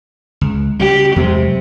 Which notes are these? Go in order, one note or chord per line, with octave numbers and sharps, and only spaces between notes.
C#2
C#3 G3 G4
E2 C3 F#3 G#3